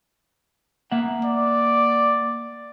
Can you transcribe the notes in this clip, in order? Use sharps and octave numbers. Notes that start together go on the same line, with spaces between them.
A#3 E5 F#5
D5